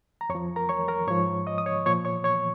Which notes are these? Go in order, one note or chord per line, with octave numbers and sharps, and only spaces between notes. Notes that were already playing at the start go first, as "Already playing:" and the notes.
A#5
F2 C#5 C#6
F3
A#4 A#5
C#5 C#6
A#4 A#5
G#2 F3 C#5 C#6
D#5 D#6
D#6
C#5 C#6
A#2 F3 C#5 C#6
C#5 C#6
C#5 C#6